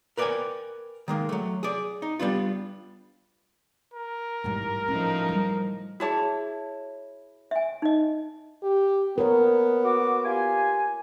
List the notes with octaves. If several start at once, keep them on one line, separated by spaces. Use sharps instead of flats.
A#4 B4 D5 E5 G5 G#5
D#3 G#3 A#3
F#3 A3
G#4 D5
D#4
G3 B3 D4 F4
A#4
A1 G#2 G3
A2 F3 C#4 D#4
E3 G3
E4 F#4 G#4 C#5 A5
E5 G#5
D#4 D#5
G4
B3 A#4 C#5
F#4 D6
F4 G4 G#5